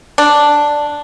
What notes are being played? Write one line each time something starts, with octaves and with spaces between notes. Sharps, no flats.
D4